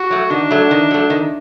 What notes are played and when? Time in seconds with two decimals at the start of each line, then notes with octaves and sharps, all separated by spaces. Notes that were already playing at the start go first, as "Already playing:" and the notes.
Already playing: F#4
0.11 F#3 A3
0.30 D#3 D4
0.51 F#3 A3
0.71 D#3
0.91 F#3 A3
1.10 D#3